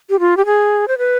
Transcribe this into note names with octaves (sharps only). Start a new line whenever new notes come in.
G4
F4
G4
G#4
C5
B4